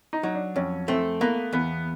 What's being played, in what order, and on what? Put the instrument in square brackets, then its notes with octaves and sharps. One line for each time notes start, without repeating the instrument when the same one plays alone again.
[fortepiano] D#4
[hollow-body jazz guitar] F#3 [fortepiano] D#4
[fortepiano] D4
[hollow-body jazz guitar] F2 [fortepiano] C#4
[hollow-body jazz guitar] A3 [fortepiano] C4
[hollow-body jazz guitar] A#3 [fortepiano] B3
[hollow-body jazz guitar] E2 [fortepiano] B3